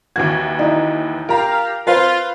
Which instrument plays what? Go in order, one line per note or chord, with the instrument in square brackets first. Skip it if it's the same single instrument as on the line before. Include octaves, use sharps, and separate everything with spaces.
[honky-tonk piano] D#2 E3 F#4 [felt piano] G#6
[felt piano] D#4 E4 E5
[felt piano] F4 [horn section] G4 F5 [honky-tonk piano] A#4 A#5
[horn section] F4 [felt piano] B4 C5 F5